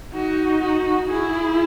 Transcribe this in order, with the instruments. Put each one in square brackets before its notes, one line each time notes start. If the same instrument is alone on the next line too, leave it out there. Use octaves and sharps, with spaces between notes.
[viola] D#4 [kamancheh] F#4
[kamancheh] F#4
[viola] E4 [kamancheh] G#4